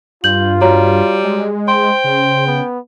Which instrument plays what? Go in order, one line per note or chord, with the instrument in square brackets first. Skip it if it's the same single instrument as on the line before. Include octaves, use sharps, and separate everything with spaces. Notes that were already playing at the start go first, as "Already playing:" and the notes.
[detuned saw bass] G2 [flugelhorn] F4 [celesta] G6 F#7
[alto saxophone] G3 [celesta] F#4 C#5 A#5
[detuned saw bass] G#3
[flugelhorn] C5 [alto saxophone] G5 [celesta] C6
[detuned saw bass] C#3
[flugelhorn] B3